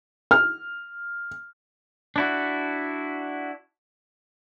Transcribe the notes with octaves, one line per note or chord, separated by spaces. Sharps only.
F6
D4 E4 F#4